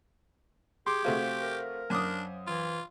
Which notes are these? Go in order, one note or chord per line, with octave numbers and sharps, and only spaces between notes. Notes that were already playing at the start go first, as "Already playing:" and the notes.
G4 G#4 C6 D6
C3 A3 F#4 C5 F5
A#4
F#2 D4 D6 D#6
E3 F4